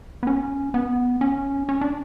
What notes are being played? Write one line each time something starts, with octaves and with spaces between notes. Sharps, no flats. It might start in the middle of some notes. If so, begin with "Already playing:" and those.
B3
C#4
B3
C#4
C#4
D4